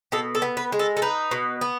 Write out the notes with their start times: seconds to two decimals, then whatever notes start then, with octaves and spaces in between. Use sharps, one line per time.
0.12 B2 A4
0.35 A4
0.42 B3
0.57 B4
0.72 G#3
0.79 A4
0.97 A4
1.02 D#4 B4
1.31 B2
1.61 B3